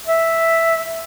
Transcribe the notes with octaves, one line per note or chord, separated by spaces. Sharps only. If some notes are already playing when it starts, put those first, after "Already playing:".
E5